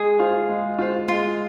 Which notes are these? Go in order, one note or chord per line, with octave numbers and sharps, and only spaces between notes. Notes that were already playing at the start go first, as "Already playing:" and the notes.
Already playing: G#3 G#4
F4 C5 F5
G#3
F4 C5 F5
G#3 F4